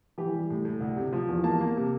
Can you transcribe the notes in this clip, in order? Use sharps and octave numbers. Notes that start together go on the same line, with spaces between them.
E3 G4
G3
A2
A2
D2
C3
F3
E2
A#3 A5
A#3
C3